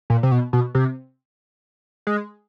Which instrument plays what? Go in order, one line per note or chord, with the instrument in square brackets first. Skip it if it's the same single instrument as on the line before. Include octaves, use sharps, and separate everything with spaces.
[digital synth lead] A#2
C3
B2
B2
C3
G#3